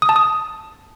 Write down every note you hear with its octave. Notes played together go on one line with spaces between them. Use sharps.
D#6
A5
D#6